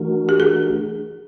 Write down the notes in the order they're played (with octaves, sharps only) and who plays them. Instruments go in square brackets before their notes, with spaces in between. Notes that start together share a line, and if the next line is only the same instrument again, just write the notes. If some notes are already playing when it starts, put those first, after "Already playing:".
Already playing: [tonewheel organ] E3 A3 D4 F#4 A#4
[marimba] G4
G#4